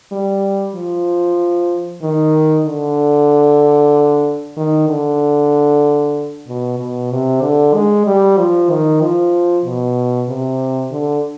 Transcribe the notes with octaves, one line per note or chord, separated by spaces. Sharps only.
G3
F3
D#3
D3
D#3
D3
B2
B2
C3
D3
G#3
G3
F3
D#3
F3
B2
C3
D3